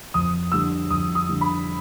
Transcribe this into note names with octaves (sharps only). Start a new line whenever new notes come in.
F2 D#6
D3 G3 E6
F2 D#6
D#6
D3 G3
B5